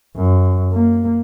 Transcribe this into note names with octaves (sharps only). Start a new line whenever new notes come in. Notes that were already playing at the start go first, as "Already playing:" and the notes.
F#2
A#3